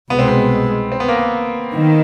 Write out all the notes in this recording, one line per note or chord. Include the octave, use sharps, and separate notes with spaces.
C2 B2 G#3 B3
C4
B3
C4
B3
A#3
B3
D#3